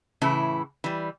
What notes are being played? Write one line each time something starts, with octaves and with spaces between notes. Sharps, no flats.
A2 C#3 E3 E4
E3 G3